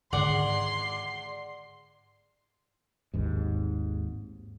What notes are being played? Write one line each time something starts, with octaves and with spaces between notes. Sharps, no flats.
G#2 D3 D#3 G#4 D5 F#5 C6
G#1 D#2 G#2